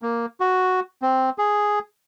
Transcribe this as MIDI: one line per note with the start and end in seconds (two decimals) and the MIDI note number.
0.02 0.26 58
0.40 0.80 66
1.02 1.30 60
1.38 1.79 68